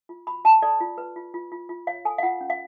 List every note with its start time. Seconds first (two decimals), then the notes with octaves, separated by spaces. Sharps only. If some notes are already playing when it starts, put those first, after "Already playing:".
0.09 F4
0.27 F#4 B5
0.45 F#4 A5
0.62 A4 D5
0.80 F4
0.98 B4
1.16 F4
1.34 F4
1.52 F4
1.69 F4
1.87 C#5 F5
2.05 A4 G#5
2.18 F5
2.23 F4 F#5
2.41 C#4
2.50 F5